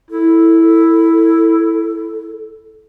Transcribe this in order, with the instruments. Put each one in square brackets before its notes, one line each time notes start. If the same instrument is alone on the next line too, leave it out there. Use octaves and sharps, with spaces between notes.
[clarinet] E4 [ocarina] A4